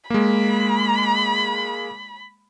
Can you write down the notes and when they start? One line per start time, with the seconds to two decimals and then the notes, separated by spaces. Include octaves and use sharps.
0.10 G#3 A#3 B5